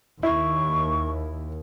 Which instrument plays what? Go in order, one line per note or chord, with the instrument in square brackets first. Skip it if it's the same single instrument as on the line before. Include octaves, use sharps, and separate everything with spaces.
[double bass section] D#2 [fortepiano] E4 [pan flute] C#6